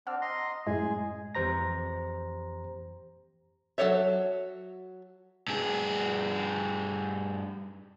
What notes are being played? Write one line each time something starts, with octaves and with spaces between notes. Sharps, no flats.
C4 D4 F#5 E6 F6
D#5 A#5 C6
F#2 A2 G#3 G#4
F2 E3 G4 C5 A#5 A#6
F#3 F4 A4 C#5 E5
G2 G#4